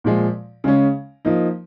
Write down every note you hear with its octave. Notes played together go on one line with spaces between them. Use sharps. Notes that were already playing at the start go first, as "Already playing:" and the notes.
A#2 F3 G#3
C#3 G#3 C#4
F3 A#3 D#4